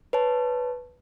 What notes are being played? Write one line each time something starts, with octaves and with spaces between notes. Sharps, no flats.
B4 C#5 A5